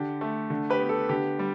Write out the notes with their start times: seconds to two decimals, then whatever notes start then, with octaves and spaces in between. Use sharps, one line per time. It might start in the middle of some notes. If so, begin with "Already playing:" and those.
Already playing: D3 G4
0.21 A3
0.50 D3
0.70 G4 B4
0.80 B3
0.89 A4
1.09 D3 G4
1.39 G3